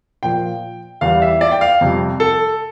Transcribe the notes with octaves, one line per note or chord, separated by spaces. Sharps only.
A#2 F3 G5
E2 E3 G3 F5
E5
D5
G5
F5
F2 C3 G3
A4